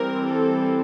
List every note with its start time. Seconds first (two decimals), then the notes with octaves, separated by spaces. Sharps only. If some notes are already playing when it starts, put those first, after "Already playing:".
Already playing: E3 G3 C4 A#4
0.27 A4